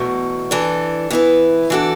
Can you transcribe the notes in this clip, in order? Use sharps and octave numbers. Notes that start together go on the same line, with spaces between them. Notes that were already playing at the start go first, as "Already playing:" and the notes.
Already playing: E2 B2 A3
E3 D4 A4
E3 B3 E4 B4
E3 D4 F#4 A4